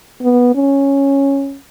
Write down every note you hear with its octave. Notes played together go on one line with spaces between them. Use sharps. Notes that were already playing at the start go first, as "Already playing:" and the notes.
B3
C#4